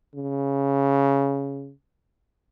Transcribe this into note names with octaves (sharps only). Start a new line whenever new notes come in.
C#3